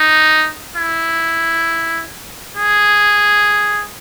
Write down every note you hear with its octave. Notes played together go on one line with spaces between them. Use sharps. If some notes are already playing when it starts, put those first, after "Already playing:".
Already playing: D#4
E4
G#4